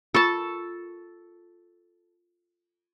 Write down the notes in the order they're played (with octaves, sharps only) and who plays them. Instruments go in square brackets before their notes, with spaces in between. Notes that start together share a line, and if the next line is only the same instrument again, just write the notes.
[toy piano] F4 A#4 C#6 [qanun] A4 A5